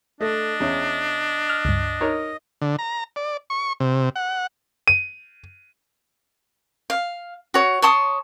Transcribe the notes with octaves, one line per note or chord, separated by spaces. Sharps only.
A3 D4 D#5
E2 C#4
F6
C#2 G2
D#4 A#4 C#5
D3
A#5
D5
C#6
C3
F#5
D#7
F5
F#4 C#5
C#5 A5 C6 D#6